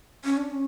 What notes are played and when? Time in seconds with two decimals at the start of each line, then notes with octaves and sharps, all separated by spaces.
0.24 C#4
0.37 D4
0.50 C#4